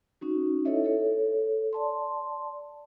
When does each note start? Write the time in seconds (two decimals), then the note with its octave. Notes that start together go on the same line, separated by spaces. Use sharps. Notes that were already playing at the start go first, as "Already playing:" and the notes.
0.21 C#4 D#4 F#4
0.65 D#4 E4 A4 C#5 D#5 E5
0.84 A4 C#5
1.73 D5 A5 C6